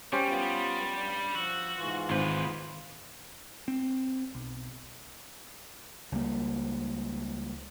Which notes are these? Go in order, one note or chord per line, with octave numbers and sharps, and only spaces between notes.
G3 C#4 G4 C5
B3 F4
G2 D5
F3 F#4 E6
G#2 E3 F4
G#1 G#3 B4 C5
C4
B1
C#2 G3 A#3